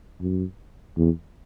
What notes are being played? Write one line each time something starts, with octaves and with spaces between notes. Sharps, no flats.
F#2
E2